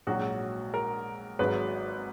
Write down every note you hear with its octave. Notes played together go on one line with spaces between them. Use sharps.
A#1 G#2 F#3 F#4
A#4
G#1 G#2 F#3 B4